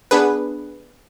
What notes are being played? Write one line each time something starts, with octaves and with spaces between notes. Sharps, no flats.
B3 D4 G#4 B4